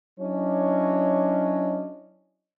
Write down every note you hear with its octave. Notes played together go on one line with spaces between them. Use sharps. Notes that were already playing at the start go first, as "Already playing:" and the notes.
F#3 C#4 D4 E4 C#5 D#5